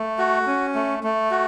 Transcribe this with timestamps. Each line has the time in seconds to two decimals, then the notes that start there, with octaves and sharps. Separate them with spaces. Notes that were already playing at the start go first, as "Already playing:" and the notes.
Already playing: A3
0.18 F#4
0.46 C#4
0.74 A3
1.03 A3
1.31 F#4